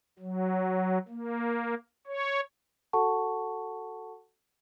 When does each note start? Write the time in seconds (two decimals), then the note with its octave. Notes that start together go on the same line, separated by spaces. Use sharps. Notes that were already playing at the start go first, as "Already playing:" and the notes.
0.19 F#3
1.08 A#3
2.07 C#5
2.93 F#4 A4 F#5 A5 C#6